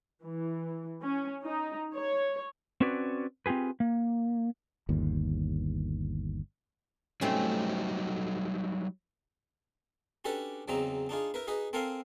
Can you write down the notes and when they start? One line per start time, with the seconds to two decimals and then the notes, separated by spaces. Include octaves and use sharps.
0.25 E3
1.03 C#4
1.45 D#4
1.94 C#5
2.81 C4 C#4 F#4 B4 C#5 D5
3.46 C4 F4 G4 G#4 B4
3.80 A#3
4.89 G1 D#2
7.21 F#3 G3 A3 C4 C#4 D#4
10.25 C#4 D4 F#4 G4 A4 B4
10.68 E2 C#3 F#3 C4 D#4 A#5
11.09 D4 D#4 F4 G#4
11.34 E4 A#4 B4
11.47 D#4 F#4 G#4 B4
11.73 C4 A4 A#4 F5 G#5 C6